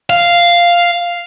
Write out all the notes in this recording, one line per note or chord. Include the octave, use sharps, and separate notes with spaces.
F5